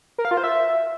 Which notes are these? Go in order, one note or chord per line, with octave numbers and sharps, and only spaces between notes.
A#4
F5
F4
C5
E5